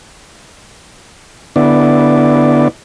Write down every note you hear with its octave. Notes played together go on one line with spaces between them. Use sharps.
D3 B3 E4 D5